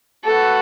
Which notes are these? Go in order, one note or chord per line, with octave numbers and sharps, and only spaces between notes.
A3 F#4 A4 B4 F#5